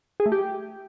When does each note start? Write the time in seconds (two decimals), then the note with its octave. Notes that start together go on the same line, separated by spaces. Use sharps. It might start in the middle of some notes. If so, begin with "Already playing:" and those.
0.20 G#4
0.26 A3
0.32 G4